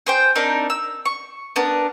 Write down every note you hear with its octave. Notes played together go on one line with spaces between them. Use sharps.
G#4 C5 G5
C4 D4 D#4 A#4
E6
C#6
B3 D4 A#4